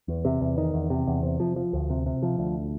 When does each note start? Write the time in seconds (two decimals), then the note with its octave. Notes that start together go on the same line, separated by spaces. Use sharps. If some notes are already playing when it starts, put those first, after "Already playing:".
0.08 E2
0.25 C3
0.41 E2
0.58 D#3
0.74 E2
0.90 C3
1.07 E2
1.23 C3
1.40 F3
1.56 F3
1.73 D2
1.90 C3
2.06 C3
2.23 F3
2.39 D2